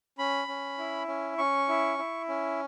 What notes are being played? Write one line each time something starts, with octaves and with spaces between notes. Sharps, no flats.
C#4 B5
C#4
E4
C#4
C#4 C#6
E4
E4
C#4